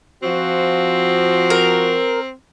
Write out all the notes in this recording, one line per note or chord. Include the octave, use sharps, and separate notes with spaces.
F3 C4 F#4
A#4